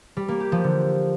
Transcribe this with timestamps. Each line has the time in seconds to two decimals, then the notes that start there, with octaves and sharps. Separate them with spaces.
0.17 G3
0.28 A#3
0.40 G4
0.52 F3
0.64 D3